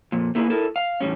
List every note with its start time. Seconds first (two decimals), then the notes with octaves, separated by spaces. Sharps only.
0.12 F2 A#2
0.35 A3 A#3 E4 F#4 G#4 B4
0.50 E4 A4 A#4
0.76 F5
1.01 E2 A2 G3 C#4